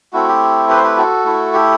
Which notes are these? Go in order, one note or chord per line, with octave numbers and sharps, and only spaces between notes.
A3 C4 E4 F#4
G4
G4 B4
C5
G4 B4
F#4 A4
A3 E4
G4